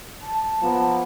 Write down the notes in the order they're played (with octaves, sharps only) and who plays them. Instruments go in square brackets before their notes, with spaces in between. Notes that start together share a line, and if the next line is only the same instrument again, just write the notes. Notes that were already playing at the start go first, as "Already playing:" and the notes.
[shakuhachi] A5
[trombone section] F3 A#3 B3